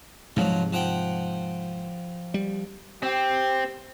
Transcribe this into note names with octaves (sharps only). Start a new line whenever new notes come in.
G#2 C3 F3 F#3 G#3
F3 F#5 G5
G3
C4 G4